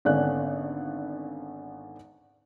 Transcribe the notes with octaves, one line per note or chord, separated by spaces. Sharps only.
G#1 D3 B3 C#4 D4 F#6